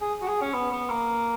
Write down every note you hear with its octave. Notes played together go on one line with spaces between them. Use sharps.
G#4
F#4
G#4
C#4
B3
B3
A#3